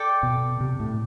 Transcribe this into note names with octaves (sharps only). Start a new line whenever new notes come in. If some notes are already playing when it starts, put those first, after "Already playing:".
Already playing: A4 D5 G5 D6
B2
C3
A2